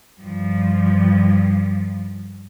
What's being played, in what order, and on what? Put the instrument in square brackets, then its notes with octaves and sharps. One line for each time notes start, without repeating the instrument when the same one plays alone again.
[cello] G2 F3